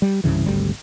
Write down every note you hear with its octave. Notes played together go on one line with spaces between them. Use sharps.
G3
C2 G2 C#3 E3
G#1 D2 G3